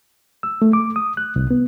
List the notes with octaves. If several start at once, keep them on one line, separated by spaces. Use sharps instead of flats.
E6
A3
D6
D#6
F#6
C2
B3